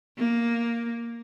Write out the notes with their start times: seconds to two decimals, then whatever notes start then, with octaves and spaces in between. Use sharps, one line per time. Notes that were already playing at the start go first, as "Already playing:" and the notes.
0.18 A#3